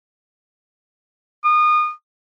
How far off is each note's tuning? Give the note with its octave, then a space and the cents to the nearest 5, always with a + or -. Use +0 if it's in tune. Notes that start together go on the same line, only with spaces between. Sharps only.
D#6 -30